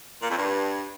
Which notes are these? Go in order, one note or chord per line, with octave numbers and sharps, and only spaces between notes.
A#2
F2
G2